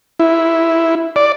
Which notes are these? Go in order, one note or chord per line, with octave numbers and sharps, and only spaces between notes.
E4
D5